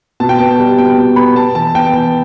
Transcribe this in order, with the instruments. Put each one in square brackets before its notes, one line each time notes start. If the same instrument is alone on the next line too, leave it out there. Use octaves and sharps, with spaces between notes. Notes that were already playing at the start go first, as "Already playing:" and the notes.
[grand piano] B2 A5
G5
B3 A5
G3
B2 G5
B2
B3 B5
B3 A5
E3 A5
B3 G5
E3